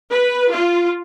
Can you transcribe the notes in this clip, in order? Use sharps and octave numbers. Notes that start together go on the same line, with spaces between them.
B4
F4